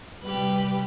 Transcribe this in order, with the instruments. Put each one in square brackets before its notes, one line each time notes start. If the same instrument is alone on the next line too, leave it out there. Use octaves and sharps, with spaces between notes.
[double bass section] C3 G3 [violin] G4 B4